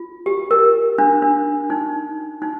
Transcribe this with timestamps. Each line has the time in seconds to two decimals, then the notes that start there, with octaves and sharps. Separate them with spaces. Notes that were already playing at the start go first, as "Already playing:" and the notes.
Already playing: F4
0.26 G4
0.51 A#4
0.98 D4
1.22 D4
1.70 D#4
2.42 D#4